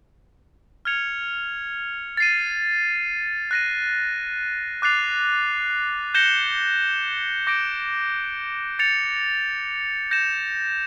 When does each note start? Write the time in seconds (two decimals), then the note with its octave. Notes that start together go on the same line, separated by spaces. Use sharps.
0.85 F6 G#6 C#7 F7
2.17 A6 C7 D#7
3.51 F#6 A#6 D#7
4.82 D6 F#6 A6 C7 F7
6.14 G6 A#6 C#7 E7 G7
7.47 D6 G6 A#6 D7
8.79 A6 C#7 F7
10.11 G6 A#6 C#7 E7